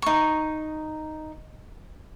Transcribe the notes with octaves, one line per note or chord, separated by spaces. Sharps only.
D#4 C#6